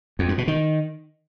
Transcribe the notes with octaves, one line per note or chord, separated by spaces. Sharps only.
F2
G2
B2
D#3